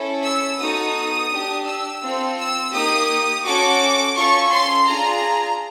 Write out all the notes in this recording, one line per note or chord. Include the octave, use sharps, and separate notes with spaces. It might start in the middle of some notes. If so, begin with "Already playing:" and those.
Already playing: C#4 E4 A4
E6
B3 D#4 F#4 A4 D#6
D4 G4
E6
C4 F4 A4
E6
A#3 D#4 G4 D#6
C#4 F#4 A4 D6
C#4 F4 A4 C#6
C6
D4 F4 G#4 A#5